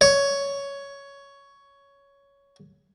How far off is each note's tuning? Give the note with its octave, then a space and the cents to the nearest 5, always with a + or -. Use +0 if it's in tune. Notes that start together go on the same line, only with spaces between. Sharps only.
C#5 +10